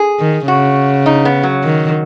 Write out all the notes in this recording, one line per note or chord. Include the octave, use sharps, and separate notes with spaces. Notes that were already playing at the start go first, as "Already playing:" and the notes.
Already playing: G#4
D#3
C#3 F#4
D#4
B3
F#3
D#3